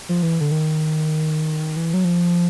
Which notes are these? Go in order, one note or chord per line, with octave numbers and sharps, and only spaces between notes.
F3
E3
D3
D#3
E3
F#3
F3